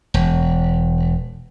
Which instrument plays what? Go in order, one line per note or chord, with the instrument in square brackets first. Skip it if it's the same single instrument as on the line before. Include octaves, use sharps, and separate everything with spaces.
[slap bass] E1